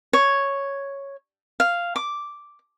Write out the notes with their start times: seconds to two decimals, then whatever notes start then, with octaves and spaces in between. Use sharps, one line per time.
0.13 C#5
1.60 F5
1.96 D6